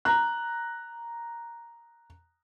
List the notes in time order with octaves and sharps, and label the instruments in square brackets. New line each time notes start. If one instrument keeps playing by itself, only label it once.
[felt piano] A#5 F#6